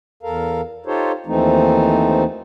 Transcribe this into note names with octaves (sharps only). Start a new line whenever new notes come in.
E2 A4 A#4 F5
D#4 F4 G4 A4 C5 C#5
D#2 E3 F3 A3 C4 D#4